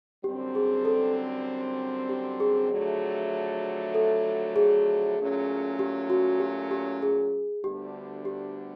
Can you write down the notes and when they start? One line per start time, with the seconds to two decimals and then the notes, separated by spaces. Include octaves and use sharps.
0.24 F#2 D3 G3 C4 G4
0.55 G#4
0.85 A4
2.09 G4
2.40 G#4
2.71 F2 D3 F#3 A3
3.95 A4
4.56 G#4
5.18 A#2 F#3 A3 C#4
5.79 G4
6.10 F#4
6.40 G4
6.71 G4
7.02 G#4
7.64 D2 D3 G3 B3 D4 G4
8.25 G4